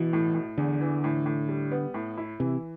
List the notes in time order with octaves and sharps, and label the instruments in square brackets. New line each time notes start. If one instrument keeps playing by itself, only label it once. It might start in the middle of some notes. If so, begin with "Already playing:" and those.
Already playing: [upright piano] B2 [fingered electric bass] E3
[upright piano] A2
A2
[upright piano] E2 [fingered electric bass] D3
[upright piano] E3
A2
A2
G3
B3
A2
E4
[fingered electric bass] C3 [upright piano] E3